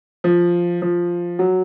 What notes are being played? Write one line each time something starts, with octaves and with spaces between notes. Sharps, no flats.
F3
F3
F#3